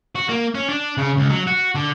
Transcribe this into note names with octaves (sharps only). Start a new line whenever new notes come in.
F#4
A#3
C#4
D4
C#3
C#2
F#3
F#4
D3